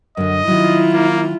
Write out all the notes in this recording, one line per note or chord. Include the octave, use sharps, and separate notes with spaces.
F#2 D3 D#5
D#3 F#3 E4 F4
A#3